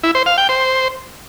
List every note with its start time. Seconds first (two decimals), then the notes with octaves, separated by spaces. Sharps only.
0.03 E4
0.15 C5
0.26 F5
0.38 G5
0.49 C5